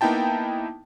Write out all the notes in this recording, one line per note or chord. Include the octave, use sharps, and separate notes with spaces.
A#3 B3 D#4 E4 G5 A5